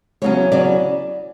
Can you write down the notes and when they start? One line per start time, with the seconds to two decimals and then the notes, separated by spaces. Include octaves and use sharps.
0.22 E2 C#3 F#3 C#4 C#5
0.52 C#3 F#3 C#4 D5